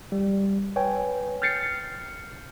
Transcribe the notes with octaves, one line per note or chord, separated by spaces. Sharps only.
G3
B4 C#5 G5 G#5
F6 G6 A6 C7 C#7